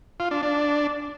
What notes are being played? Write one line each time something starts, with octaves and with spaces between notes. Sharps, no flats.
F4
D4
D4